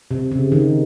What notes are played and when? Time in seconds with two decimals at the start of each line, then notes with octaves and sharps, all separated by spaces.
0.11 C3
0.31 C#3
0.52 D#3